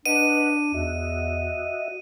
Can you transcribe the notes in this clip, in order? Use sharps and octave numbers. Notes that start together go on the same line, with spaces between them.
D4 B4 D#5 F#5 D#7
E2 F#4 D#5 E5